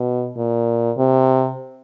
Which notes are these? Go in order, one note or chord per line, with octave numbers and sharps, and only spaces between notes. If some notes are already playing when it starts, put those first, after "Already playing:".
Already playing: B2
A#2
C3